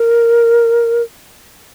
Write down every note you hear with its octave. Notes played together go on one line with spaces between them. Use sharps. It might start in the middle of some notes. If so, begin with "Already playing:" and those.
Already playing: A#4